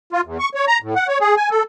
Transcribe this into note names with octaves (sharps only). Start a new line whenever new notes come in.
F4
E2
C#6
C#5
A#5
A2
F#5
C#5
G#4
G#5
A4